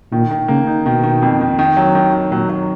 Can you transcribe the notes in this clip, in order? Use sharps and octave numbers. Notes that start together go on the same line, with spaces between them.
A#2 D#3
D#3
C#3 A#3
D#4
B2 D#3
D#3
F2
D#3
D#3
F#3
D#3
D#3
A#2 F#3
F#3